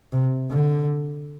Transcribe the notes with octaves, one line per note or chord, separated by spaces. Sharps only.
C3
D3